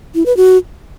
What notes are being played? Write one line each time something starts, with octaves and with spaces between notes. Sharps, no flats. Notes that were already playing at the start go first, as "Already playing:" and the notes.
E4
B4
F#4